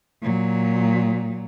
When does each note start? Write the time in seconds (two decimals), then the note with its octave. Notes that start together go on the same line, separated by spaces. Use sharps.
0.22 A#2 F#3